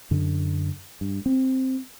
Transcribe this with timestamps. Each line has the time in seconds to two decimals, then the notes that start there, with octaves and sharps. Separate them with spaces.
0.11 F#2 D3
1.01 G2
1.26 C4